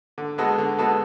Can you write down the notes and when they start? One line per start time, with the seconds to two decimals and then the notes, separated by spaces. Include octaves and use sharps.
0.18 D3
0.38 G#3 B3 F#4 A4
0.58 D3
0.78 G#3 B3 F#4 A4